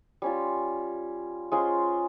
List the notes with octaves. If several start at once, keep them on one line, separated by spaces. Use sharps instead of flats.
G3 C#4 F4
G#3 C#4 F4 C5